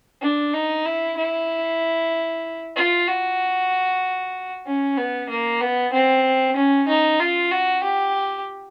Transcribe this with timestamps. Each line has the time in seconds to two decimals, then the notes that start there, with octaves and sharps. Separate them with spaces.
0.22 D4
0.54 D#4
0.86 E4
1.17 E4
2.76 F4
3.08 F#4
4.66 C#4
4.97 B3
5.29 A#3
5.61 B3
5.93 C4
6.56 C#4
6.88 D#4
7.20 F4
7.51 F#4
7.83 G4